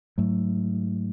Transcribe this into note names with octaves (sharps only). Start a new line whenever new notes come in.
G#2 F#3 A3